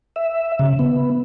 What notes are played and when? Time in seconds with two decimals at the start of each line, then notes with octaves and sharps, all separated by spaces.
0.16 E5
0.59 C#3
0.79 B3